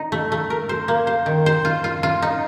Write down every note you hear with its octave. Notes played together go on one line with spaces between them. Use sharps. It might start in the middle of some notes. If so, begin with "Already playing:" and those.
Already playing: D#4
A3
A3
A#4
C5
A#3
C5
D#3
C5
F4
F4
F4
D#4